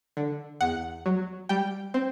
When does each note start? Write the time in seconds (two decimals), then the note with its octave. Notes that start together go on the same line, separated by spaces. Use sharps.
0.17 D3
0.61 E2 F#5
1.06 F#3
1.49 G3 G5
1.94 C4